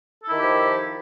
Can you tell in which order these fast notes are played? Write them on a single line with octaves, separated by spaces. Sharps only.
A4 E4 D#3 G4 F3